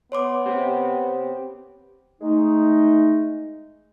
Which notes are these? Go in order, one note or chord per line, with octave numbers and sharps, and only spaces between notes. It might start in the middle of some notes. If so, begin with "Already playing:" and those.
B3 C#5 C6 D6
C4 G4
G#3 A3 D#4